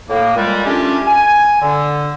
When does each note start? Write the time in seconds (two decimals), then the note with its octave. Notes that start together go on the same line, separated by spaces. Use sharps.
0.09 A2 A#3
0.36 A#2 G3 G#3
0.66 G3 A3 C#4 D4 F4 G4
1.08 G#5
1.61 D3